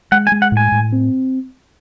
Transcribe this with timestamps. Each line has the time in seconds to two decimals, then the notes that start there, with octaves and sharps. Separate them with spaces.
0.12 G#3 F#5
0.27 G#5
0.32 G#3
0.42 F#5
0.52 A2
0.57 G#5
0.72 A2
0.92 C4